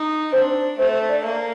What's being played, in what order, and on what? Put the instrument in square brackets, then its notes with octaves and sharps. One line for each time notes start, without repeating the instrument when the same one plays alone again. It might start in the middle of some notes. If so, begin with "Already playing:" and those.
Already playing: [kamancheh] D#4
[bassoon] C4 [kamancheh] D4
[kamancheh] A3 [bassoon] C4
[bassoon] D4
[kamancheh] A#3